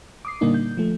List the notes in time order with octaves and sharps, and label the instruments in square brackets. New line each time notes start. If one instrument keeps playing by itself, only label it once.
[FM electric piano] D6 D#6 C7
A#2 D3 G3 A#3 D4 D#4
G6
F3 A3